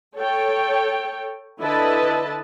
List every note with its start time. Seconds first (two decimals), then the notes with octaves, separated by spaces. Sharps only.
0.16 A4 C#5 G5
1.60 D3 E4 B4 D#5 A5